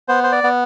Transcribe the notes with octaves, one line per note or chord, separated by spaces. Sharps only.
B3 C5
C5
D5
B3